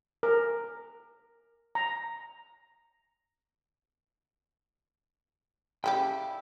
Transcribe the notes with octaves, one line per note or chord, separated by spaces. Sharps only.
A#4
A#5
C#3 G3 E4 G4 G5